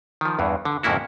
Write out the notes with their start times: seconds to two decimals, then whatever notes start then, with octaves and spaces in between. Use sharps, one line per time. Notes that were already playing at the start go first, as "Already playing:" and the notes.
0.21 D#3 F3
0.39 E2 G2 E3
0.65 D3
0.83 F2 G#2 C#3 A#3 E4 F#4